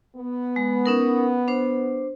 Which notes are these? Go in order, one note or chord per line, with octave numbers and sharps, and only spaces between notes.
B3
G#3
C#4 D#4 A#4
D4 C5